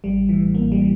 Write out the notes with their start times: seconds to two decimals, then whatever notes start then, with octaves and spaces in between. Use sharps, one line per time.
0.04 A1 G3
0.29 A2 E3
0.55 A1 A#3
0.72 G3
0.80 E3